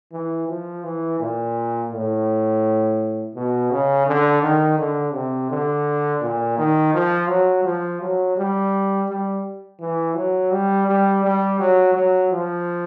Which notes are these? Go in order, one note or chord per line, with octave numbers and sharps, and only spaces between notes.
E3
F3
E3
A#2
A2
B2
C#3
D3
D#3
D3
C3
D3
A#2
D#3
F3
F#3
F3
F#3
G3
G3
E3
F#3
G3
G3
G3
F#3
F#3
F3